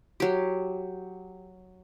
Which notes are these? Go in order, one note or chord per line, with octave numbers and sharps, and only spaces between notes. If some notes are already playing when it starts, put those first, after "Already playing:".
F#3 G4